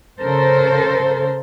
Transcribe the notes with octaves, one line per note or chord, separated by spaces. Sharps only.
C#3 A4 A#4 C5